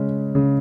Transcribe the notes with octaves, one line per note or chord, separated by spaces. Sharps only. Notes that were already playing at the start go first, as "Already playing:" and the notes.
Already playing: C#3 G#3 C#4
C#3